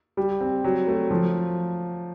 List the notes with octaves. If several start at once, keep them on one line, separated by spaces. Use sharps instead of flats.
G3
C4
F#3
A3
F3